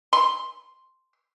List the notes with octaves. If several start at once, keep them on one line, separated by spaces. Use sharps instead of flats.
C6